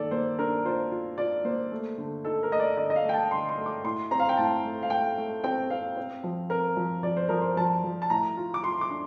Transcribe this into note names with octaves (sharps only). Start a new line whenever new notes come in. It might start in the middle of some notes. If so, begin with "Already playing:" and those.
Already playing: D#3 A#3 A4 D5
A#3 C5
D4 A#4
F4 C5
F4
F4 D5
A#3 C5
A3
D3
D#4 A4
A#4
A3 D#5
D5
D3 D#5
D#5
F5
A3 G5
A5
D3 C6
C6
A3
D6
A2 C6
C4 A#5
F5
G5
A2 A5
A3
F5
A3 G5
A3
C4 G5
C4 F5
C4
F3
C4 A#4
F3
F3 D5
C5
F3 A#4
C5
F3 A5
F3
A5
A2 A#5
F4
D6
F4 C6
D6
D4